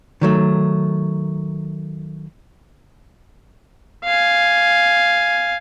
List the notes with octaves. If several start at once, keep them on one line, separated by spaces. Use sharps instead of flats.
D#3 F#3 A3
F5 G#5